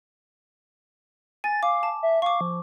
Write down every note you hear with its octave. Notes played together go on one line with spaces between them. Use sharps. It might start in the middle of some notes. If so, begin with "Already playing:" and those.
G#5 A6
F5 D6
A5
E5
F5 C#6 D6
F3